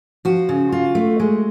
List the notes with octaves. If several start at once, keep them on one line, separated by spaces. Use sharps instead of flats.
F3 F#4
C#3
F4
A3
G#3